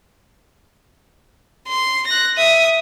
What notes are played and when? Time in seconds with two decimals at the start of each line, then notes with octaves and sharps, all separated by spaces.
1.68 C6
2.07 F#6 A#6
2.37 E5 D#6